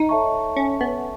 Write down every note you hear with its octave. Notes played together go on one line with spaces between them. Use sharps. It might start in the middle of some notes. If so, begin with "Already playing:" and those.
Already playing: D#4
A4 C#5 E5 A5 C#6
C#4
B3